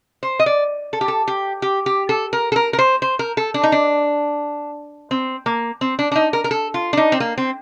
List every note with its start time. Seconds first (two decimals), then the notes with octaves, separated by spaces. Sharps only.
0.23 C5
0.39 D#5
0.46 D5
0.93 A4
1.01 G4
1.08 A4
1.28 G4
1.62 G4
1.86 G4
2.09 A4
2.33 A#4
2.52 A4
2.56 A#4
2.73 A#4
2.79 C5
3.02 C5
3.19 A#4
3.37 A4
3.54 D4
3.63 D#4
3.72 D4
5.11 C4
5.46 A#3
5.81 C4
5.99 D4
6.12 D4
6.16 D#4
6.33 A#4
6.44 A#4
6.51 A4
6.74 F4
6.93 D4
6.97 D#4
7.12 C4
7.20 A#3
7.38 C4